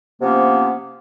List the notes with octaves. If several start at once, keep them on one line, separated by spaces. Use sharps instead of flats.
C3 F3 A#3 B3 C#4